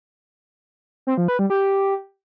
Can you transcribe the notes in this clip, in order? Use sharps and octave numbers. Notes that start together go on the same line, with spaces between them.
C4
F3
B4
G3
G4